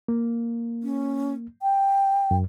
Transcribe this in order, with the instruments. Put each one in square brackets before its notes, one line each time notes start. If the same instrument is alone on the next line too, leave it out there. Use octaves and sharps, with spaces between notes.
[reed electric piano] A#3
[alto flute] C#4
G5
[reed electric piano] F#2